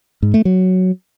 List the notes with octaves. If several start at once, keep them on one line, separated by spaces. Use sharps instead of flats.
G#2
A3
F#3